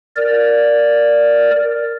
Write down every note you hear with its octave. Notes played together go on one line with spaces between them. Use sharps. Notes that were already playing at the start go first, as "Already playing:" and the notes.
A#4 D5